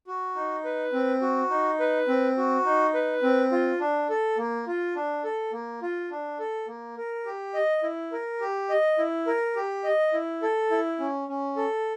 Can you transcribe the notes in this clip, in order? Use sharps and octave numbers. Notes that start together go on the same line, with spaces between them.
F#4
D#4
B4
C4
F#4
D#4
B4
C4
F#4
D#4
B4
C4
F4
D4
A4
A#3
F4
D4
A4
A#3
F4
D4
A4
A#3
A#4
G4
D#5
E4
A#4
G4
D#5
E4
A#4
G4
D#5
E4
A4
E4
C#4
C#4
A4